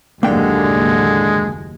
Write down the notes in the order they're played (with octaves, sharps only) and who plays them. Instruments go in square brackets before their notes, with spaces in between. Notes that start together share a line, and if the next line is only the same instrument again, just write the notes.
[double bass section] F#1 D#2 A2 [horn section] D3 [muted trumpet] G#3 [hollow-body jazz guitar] A#3 G5